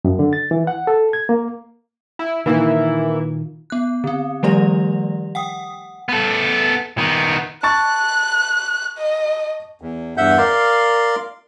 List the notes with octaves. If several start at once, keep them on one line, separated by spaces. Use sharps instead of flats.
F#2
D3
A6
E3
F#5
A4
G#6
A#3
E4
A#2 D#3 E3 A#3 E4
B3 F#6
D3 C4
D#3 F3 G3 A3 G4 D5
F#5 G5 D#6
B3 A4
D#3 B3
A5 C#6 F#6 A6
D#5
E2
E2 G2 E5 F#5 G6
A#4 D5 F5 C6